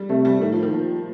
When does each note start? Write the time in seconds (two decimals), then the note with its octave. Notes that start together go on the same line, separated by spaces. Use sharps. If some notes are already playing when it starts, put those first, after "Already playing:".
Already playing: G3
0.09 C3 A3
0.25 G3
0.41 A2 D#3
0.52 F3
0.63 D#3
0.72 A#2 F3